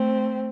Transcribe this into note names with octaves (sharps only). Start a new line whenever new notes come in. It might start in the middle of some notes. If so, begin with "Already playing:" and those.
Already playing: A3 C4